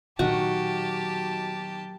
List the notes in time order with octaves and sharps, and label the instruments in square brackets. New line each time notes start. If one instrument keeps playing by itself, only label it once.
[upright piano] B1 D#3 [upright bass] A#2 F#3 [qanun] F#4 [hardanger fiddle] G4 A5